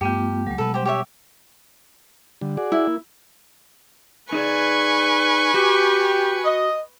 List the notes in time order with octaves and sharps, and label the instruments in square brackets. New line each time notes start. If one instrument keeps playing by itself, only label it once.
[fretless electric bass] G2 [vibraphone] A3 B3 F4 [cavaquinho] G4 G5
[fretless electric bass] C#2 A3 [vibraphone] F#3 G#3
[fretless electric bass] B2 G3 [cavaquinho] A4 B4
[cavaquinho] G4 C5
G4 C#5 E5
[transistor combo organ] D3 G3
F#4 G#4 D5
[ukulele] E4
[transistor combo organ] A#3
[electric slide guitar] D#4 G#4 D5 [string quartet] B4 G#5 C#6
[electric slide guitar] F#4 [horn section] G4
[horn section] D#5